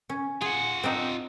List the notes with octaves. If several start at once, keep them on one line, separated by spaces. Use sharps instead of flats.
C#4
F4 G#4 F#5
C4 D4 D#4